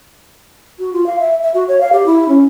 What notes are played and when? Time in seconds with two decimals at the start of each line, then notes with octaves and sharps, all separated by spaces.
0.79 F#4
0.93 F4
1.06 F5
1.20 E5
1.42 E5
1.54 F#4
1.68 C#5
1.81 F5
1.93 G4
2.06 E4
2.29 C#4